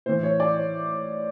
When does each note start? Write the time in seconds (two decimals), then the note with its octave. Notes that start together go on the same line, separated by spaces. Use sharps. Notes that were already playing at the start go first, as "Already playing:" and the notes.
0.06 A2 E3 C5
0.23 C#5
0.40 D5
0.56 C#5